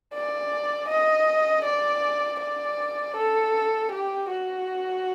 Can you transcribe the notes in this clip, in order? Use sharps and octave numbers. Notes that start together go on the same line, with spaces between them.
D5
D#5
D5
D5
A4
G4
F#4